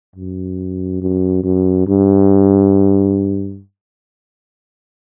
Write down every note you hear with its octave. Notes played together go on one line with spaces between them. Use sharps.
F#2
F#2
F#2
G2